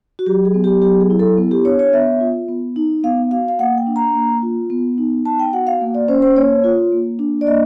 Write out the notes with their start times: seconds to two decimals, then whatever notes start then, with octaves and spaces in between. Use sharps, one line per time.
0.19 F#4
0.26 F#3 G4
0.45 G#4
0.54 B3
0.64 G4
0.82 F#3 G4
1.01 G#4
1.10 E4
1.19 A4
1.37 B3
1.51 G4
1.65 D4 C#5
1.79 C#5
1.93 B3 E5
2.20 F4
2.49 B3
2.76 D#4
3.04 B3 F5
3.31 F#4 F5
3.48 F5
3.59 A#3 F#5
3.77 G5
3.87 D4
3.96 A#5
4.15 A#3
4.42 F4
4.70 B3
4.98 D#4
5.25 B3 A5
5.39 G5
5.53 F#4 F#5
5.67 F5
5.81 A#3
5.95 D5
6.08 C#4 C5
6.22 C5
6.36 A#3 C#5
6.64 F4
6.92 A#3
7.19 D4
7.41 D5
7.47 A#3 D#5